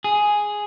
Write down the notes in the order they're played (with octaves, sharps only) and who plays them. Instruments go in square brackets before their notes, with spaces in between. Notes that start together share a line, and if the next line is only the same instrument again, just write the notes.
[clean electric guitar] G#4